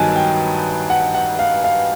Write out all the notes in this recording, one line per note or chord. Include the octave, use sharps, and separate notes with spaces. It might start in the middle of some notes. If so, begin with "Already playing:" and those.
Already playing: G2 D#3 F#3 B3 G#5 A5
G5
F#5
F#5
F5
F5